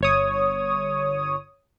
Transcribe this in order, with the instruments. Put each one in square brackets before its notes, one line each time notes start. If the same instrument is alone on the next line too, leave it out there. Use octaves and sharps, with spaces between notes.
[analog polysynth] G1 C#5 D#6